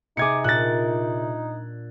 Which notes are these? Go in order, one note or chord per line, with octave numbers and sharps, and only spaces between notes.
C3 D#4 G#4 D6 G#6 C#7
A#2 D4 F#6 A6